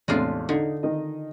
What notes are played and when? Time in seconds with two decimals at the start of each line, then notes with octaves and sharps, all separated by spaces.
0.08 E2 A2 C3 G#3 D4 F4
0.49 D3 D#4
0.83 D#3 D#5